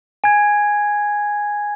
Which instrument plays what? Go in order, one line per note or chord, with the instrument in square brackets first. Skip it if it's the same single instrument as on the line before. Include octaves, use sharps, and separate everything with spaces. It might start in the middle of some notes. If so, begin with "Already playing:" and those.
[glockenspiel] G#5 G#6